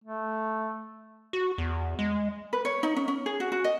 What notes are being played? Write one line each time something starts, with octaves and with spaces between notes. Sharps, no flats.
A3
F#4
E2
G#3
B4
C#5
D#4
C#4
C#4
G#4
F#4
F#4
D#5